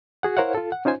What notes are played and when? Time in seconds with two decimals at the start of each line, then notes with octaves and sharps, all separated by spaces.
0.23 F#4 G#4 F#5
0.37 E4 A#4 C5 C#5 F5 F#5
0.55 F4 A4
0.72 F#5
0.85 C#4 D#4 F4 C5 G#5